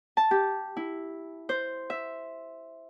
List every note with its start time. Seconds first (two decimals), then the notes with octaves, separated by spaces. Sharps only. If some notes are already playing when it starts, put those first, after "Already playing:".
0.17 A5
0.31 G4
0.77 E4
1.49 C5
1.90 E5